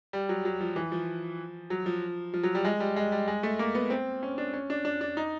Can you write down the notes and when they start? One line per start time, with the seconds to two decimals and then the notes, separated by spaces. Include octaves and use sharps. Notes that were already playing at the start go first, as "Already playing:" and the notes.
0.13 G3
0.29 F#3
0.45 F#3
0.61 F3
0.76 E3
0.92 F3
1.70 F#3
1.86 F3
2.34 F3
2.43 F#3
2.55 G3
2.65 G#3
2.80 G3
2.96 G#3
3.12 G3
3.28 G#3
3.43 A3
3.59 A#3
3.75 B3
3.90 C4
4.23 C#4
4.38 D4
4.53 C#4
4.70 D4
4.85 D4
5.01 D4
5.17 D#4